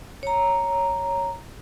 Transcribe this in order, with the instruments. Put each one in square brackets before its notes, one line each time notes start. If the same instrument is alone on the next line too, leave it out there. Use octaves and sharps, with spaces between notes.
[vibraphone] C#5 A#5